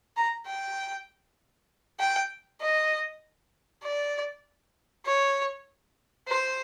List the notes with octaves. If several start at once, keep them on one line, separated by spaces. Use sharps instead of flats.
A#5
G5
G5
D#5
D5
C#5
C5